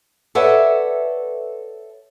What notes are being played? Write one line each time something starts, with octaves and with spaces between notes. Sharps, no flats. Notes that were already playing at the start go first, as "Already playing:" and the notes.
A4 B4 C#5 D5 E5 F#5